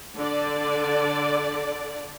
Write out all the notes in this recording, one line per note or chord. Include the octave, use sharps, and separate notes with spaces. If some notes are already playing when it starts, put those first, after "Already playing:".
D3 D5